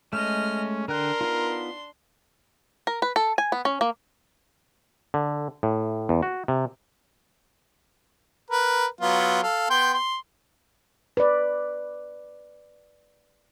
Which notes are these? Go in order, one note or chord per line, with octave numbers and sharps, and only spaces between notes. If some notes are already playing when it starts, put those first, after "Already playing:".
G#3 A3 C#4 D#5 F6
D3 D4 A#4 G5 C6 F#6
B3 D#4 F4
A#4
B4
A4
G#5
B3
C#4
A#3
D3
A2
E2
F#4
C3
A#4 B4
F#3 B3 F4
A4 F5
B3 G5 C6
C6
B4 D5